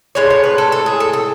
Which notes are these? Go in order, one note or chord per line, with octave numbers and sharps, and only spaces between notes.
A2 G#3 C#5
C#5
B4
A4
A4
G#4
A4
A4